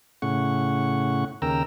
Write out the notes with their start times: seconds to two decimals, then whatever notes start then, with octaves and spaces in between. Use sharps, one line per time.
0.22 A2 C#3 F#5 C#6
1.42 D#2 C#3 A#4 G5 A#5 E6